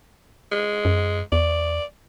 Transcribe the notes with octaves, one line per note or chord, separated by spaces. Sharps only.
G#3
F#2
E2 D5